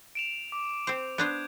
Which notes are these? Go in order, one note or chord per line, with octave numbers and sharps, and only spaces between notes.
D7 E7 F7
D6
C4 C5
B3 D4 C5 G6 G#6